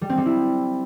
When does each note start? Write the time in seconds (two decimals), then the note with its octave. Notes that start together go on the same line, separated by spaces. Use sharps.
0.01 G3
0.10 C4
0.18 G3
0.26 E4